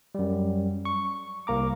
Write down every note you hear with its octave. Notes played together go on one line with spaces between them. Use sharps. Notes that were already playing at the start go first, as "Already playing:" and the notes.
F#2 G3
C#6
C2 A#3 A#5 D6